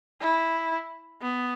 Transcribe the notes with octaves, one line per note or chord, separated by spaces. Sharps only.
E4
B3